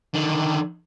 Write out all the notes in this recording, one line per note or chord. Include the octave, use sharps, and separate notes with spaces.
D3 D#3